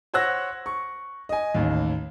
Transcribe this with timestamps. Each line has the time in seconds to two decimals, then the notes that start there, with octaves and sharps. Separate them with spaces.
0.14 C5 C#5 F#5 E6 F#6 A#6
0.66 C#6
1.29 D#5 G#5
1.55 A1 D#2